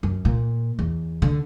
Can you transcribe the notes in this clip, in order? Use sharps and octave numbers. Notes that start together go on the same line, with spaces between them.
F#2
A#2
E2
D3